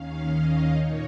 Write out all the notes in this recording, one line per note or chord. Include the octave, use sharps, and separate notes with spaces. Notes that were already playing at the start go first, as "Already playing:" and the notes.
Already playing: D#2 D#3 C#4 F5
D#5
A#2 A#3 D#4 C#5